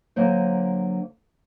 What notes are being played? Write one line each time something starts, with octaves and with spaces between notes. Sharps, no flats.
D3 F#3 A#3 C5